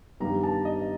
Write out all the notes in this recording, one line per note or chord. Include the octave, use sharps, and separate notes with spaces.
G2 D#3 G3 B3 A#5
A5
D#5